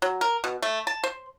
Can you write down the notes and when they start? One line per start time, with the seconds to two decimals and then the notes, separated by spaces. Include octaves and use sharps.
0.02 F#3
0.21 A#4
0.44 B2
0.62 A3
0.87 A5
1.04 C5